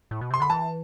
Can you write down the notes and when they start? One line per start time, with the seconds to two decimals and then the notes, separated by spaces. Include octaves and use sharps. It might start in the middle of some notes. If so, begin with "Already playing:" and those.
0.11 A2
0.21 B2
0.30 C3 C6
0.40 D3 B5
0.50 E3 A5